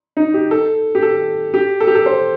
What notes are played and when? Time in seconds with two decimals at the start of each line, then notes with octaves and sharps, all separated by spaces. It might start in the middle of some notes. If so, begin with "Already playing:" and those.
0.17 D#4
0.34 G4
0.51 A4
0.95 G4
1.02 A4
1.54 G4
1.80 A4
1.87 G4
1.95 A4
2.06 C5